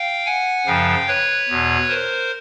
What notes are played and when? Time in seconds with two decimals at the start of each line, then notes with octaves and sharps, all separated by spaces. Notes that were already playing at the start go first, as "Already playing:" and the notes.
Already playing: F5 G5
0.26 F#5 G#5
0.66 F#2 C#3 F3 F5 G5
1.08 B4 C#5
1.49 E2 B2
1.89 A#4 C5